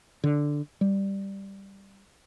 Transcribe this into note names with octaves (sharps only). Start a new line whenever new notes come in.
D3
G3